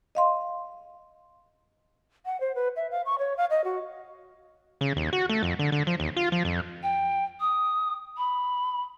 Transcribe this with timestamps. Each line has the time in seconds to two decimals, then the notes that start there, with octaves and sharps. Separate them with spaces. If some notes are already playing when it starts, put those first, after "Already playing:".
0.15 D#5 F5 C6
2.26 F#5
2.41 C5
2.55 B4
2.76 E5
2.91 F5
3.06 C#6
3.19 C#5
3.37 F5
3.50 D#5
3.64 F#4
4.81 C#3
4.96 D#2
5.13 F#4
5.29 A3
5.43 F2
5.59 D3
5.72 D3
5.87 F3
6.00 D#2
6.17 F4
6.32 F3
6.45 F2
6.83 G5
7.40 D#6
8.17 B5